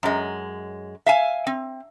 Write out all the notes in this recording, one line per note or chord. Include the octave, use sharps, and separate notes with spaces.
F#2 G#3
E5 F5 G#5
C4